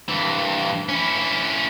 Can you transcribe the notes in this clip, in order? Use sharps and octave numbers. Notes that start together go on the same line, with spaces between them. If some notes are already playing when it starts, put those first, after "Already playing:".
G2 E3
C#4 E4